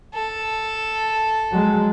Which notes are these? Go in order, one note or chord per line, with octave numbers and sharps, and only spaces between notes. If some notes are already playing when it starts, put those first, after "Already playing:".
A4
F#3 G#3